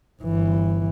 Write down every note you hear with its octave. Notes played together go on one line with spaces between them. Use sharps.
G1 E3